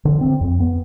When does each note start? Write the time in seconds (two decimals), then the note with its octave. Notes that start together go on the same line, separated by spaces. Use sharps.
0.05 D3
0.21 C4
0.41 F2
0.60 B3